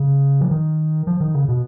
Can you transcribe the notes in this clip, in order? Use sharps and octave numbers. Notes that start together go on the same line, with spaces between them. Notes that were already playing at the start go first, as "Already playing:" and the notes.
Already playing: C#3
F3
D#3
F3
D#3
C#3
B2